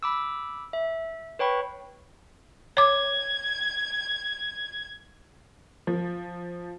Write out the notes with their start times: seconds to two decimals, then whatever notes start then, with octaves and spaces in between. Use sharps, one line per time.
0.03 B5 D6 E6
0.73 E5
1.39 B4 C#5 G5 B5 C#6
2.77 C#5 D6 G#6
5.87 F3